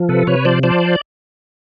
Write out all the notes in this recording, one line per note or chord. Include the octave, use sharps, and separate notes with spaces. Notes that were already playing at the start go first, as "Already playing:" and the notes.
Already playing: F3
C3 A4 B4
C3 B4 C#5
F3 C5 D5
F3 C5 D5